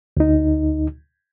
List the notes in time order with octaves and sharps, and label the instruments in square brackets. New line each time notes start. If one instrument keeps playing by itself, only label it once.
[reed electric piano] D2 D#4